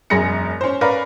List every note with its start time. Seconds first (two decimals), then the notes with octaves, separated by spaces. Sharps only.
0.10 E1 F#2 G#4 A#6 C#7
0.61 C#4 C5
0.81 C#4 A#4 B4 D5 F5